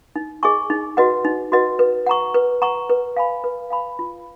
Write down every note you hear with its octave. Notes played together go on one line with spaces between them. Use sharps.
D#4
G#4 D#5 G#5 C#6
D#4
F#4 B4 D#5 F#5
D#4
F#4 B4 D#5 F#5
B4
F#5 A#5 C#6
B4
F#5 A#5 C#6
B4
F5 G#5 B5
B4
F5 G#5 B5
F4